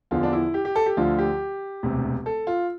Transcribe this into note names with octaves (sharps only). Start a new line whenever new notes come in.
E2 D3 F3 F4
D4
E4
G4
G4
A4
G4
D2 D3 F3 F4
G4
E1 D2 C3
A4
F4